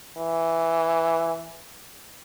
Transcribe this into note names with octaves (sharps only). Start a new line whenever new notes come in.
E3